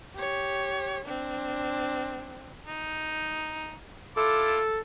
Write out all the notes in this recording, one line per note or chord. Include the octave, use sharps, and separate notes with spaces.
G4 C#5
C4 D4
D#4
E4 F4 A4 D6